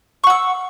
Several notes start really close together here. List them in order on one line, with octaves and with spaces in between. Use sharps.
C#6 F#5 E6